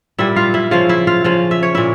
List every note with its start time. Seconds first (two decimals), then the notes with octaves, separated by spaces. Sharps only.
0.18 A#2 G3 E4 E5
0.36 F4 F5
0.54 E4 E5
0.71 C#3 F3 F4 F5
0.89 E4 E5
1.07 F4 F5
1.24 C#3 F3 F4 F5
1.51 E5
1.63 C#5
1.75 A#2 E4 E5